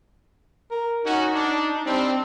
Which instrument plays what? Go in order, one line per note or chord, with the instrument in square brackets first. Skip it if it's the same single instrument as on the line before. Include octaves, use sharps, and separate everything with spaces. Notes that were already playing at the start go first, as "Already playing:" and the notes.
[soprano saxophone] A#4
[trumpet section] C#4 F#4 [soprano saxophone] D#4
[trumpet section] D4
[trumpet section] G3 C4 [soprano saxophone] D4